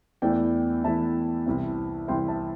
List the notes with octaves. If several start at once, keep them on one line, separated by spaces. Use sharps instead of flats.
E2 E3 A3 E4 D5 G5
E2 E3 A3 E4 E5 A5
C2 C3 E3 C4 E4
C2 C3 E3 C4 E4 G5 C6
E5 A5